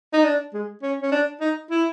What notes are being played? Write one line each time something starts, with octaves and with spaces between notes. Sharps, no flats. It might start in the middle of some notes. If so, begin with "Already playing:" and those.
D#4
D4
G#3
C#4
C#4
D4
D#4
E4